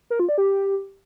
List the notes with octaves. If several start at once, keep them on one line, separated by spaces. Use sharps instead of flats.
A#4
F4
D5
G4